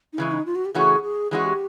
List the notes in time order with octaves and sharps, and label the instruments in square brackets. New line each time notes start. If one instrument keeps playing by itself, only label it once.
[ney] D#4
[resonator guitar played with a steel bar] C#3 E3 G#3 [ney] E4
[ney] D#4
F4
F#4
G4
[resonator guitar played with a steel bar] C#3 E3 A3 C#4 F#4 [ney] G#4
[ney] G#4
[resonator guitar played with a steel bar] E3 G#3 C#4 F#4 [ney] G#4
[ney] G4